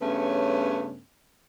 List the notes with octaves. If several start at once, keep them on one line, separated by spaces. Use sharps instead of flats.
G2 C#3 A3 B3 C#4